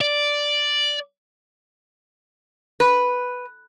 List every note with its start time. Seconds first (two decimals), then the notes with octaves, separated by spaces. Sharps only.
0.01 D5
2.80 B4